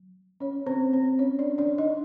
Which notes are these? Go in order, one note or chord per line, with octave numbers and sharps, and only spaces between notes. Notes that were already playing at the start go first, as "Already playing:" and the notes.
Already playing: F#3
C#4 C#5
C4 C5
C4 C5
C#4 C#5
D4 D5
D4 D5
D#4 D#5